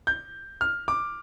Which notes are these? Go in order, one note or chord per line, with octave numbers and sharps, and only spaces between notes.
G6
F6
D6